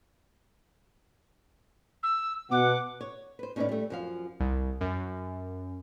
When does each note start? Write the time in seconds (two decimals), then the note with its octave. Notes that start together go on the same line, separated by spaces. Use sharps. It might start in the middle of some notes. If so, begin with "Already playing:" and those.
2.03 E6
2.51 B2 F#5 D6
3.01 C#5
3.39 B4 C5
3.56 A2 C#4 D#4 G#4 B4 D5
3.69 G3 A3
3.90 F#2 F3 F5
4.40 C2
4.81 F#2